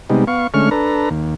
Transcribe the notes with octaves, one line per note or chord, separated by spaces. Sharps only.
C3 G3 G#3 B3 D#4
B3 F5 C#6
D3 G#3 A3 C#4 C#6 F6
D4 A4 B4 A#5
D#2